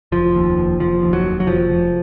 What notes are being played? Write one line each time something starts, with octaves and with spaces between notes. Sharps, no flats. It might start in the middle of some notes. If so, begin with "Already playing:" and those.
F1 F3
D#2
F1
F1 F3
D#2
F#3
F1
F#3
F1 F3
F1